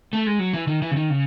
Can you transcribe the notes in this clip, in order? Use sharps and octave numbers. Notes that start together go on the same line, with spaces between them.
A3
G#3
F#3
E3
D#3
E3
C#3
D#3
C#3